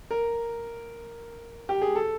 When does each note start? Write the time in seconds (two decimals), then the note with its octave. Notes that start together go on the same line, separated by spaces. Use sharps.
0.11 A#4
1.69 G4
1.82 G#4
1.95 A4